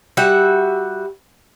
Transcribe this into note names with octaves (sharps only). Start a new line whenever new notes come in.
G3 F#4 E5 F#5